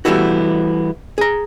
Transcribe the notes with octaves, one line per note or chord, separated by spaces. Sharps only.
E3 G3 A3 B3 E4 F#4
G#4 A#5